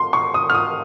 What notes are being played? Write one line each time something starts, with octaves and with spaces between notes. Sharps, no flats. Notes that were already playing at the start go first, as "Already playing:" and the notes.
Already playing: C6
C#6
D#6
F6
D#6